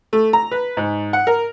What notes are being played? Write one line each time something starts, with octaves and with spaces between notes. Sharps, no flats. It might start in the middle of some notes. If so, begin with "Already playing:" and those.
A3
A#5
B4
G#2
F#5
A#4